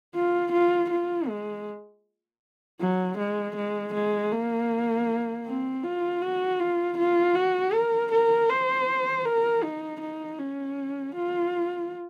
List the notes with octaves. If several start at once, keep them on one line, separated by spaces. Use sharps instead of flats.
F4
F4
F4
G#3
F#3
G#3
G#3
G#3
A#3
C4
F4
F#4
F4
F4
F#4
A#4
A#4
C5
A#4
D#4
D#4
C#4
F4